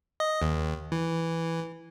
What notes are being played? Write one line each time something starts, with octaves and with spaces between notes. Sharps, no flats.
D#5
D#2
E3